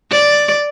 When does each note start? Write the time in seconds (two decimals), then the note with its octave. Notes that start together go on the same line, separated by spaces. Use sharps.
0.11 D5